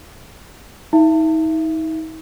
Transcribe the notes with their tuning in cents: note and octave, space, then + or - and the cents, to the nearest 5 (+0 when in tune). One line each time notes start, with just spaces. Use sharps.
D#4 +40 E5 +30